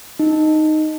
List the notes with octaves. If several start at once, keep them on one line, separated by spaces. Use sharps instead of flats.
D#4